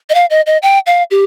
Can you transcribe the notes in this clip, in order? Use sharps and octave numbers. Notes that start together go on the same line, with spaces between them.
D#5
F5
D#5
D#5
G5
F5
G4